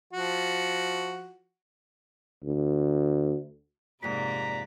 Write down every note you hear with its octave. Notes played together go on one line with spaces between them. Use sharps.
F3 F#4
D2
F2 G#2 C3 A#3 D5 A#5 B6